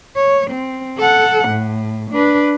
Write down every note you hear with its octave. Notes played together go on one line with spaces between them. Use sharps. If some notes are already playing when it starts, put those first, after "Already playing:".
C#5
C4
A4 F#5
A2
D4 B4